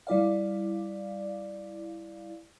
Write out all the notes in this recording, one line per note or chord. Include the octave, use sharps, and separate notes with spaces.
G3 E4 D5 F5